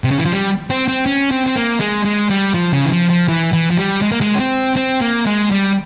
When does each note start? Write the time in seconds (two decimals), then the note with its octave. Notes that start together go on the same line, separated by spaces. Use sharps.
0.04 C3
0.11 C#3
0.18 E3
0.25 F3
0.33 G3
0.70 C4
0.88 C4
1.06 C#4
1.31 C4
1.47 C4
1.56 A#3
1.80 G#3
2.05 G#3
2.30 G3
2.54 F3
2.73 C#3
2.85 E3
2.92 F3
3.10 F3
3.28 E3
3.53 E3
3.70 F3
3.77 G3
4.02 G#3
4.12 A#3
4.21 G#3
4.35 C#4
4.40 C4
4.76 C4
5.01 A#3
5.26 G#3
5.51 G3